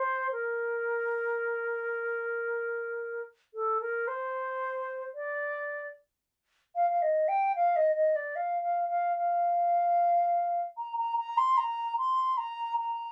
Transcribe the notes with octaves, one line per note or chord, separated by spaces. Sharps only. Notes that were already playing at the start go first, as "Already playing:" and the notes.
Already playing: C5
A#4
A4
A#4
C5
D5
F5
F5
D#5
G5
F5
D#5
D#5
D5
F5
F5
F5
F5
A#5
A#5
A#5
C6
A#5
C6
A#5
A#5